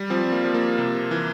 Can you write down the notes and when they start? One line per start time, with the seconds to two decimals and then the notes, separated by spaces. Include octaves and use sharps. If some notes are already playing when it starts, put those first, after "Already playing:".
Already playing: G3
0.10 F3 C4
0.32 A#3
0.44 F3
0.54 A#3
0.78 C3
1.11 E3